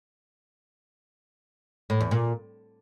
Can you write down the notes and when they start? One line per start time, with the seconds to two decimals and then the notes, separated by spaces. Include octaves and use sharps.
1.90 A2
2.01 E2
2.11 A#2